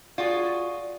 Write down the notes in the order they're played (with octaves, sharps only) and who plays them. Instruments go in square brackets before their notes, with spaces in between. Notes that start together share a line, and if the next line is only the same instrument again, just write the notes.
[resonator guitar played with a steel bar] F4 F#4 G#4 [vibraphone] D5